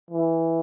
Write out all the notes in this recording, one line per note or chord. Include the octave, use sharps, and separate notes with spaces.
E3